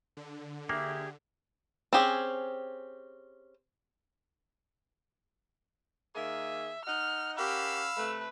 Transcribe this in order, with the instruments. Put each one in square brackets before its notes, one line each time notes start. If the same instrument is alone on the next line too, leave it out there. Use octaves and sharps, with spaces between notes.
[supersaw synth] D3
[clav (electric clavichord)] A#3 [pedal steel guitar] G4 G#4 [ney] E5
[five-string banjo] C4 C#4 G4 G#4
[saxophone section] D#3 A#3 G#4 [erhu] E5
[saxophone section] D#4 D#5 F#5 [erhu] F6
[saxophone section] C#4 A#4 F#5 [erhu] G4 [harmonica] F5 B5 E6
[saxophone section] C3 A3 [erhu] B4